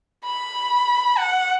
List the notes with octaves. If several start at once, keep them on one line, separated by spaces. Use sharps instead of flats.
B5
F#5